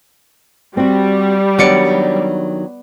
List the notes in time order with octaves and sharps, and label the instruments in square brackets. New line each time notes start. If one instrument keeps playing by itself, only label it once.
[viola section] G3 [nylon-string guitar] C4 F#4
[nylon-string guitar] D#3 F#3 D4 [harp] B3 D5 C#7